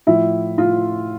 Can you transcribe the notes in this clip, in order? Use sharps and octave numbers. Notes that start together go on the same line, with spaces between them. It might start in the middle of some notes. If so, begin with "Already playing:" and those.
A2 F3 E4
A2 F4